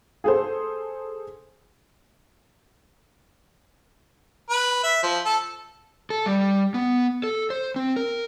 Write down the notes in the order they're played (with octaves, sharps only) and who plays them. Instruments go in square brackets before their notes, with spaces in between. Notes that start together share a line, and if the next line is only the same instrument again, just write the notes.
[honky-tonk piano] G#4 A4 C5
[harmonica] B4
E5
F3
A4
[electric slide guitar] A4
G3
B3
A4
C5
C4
A#4